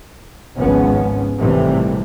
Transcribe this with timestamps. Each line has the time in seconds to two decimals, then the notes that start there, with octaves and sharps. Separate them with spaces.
0.56 G#1 C#2 G#2 F3 B3 C#4
1.38 G#1 F2 A2 C3 E3 G3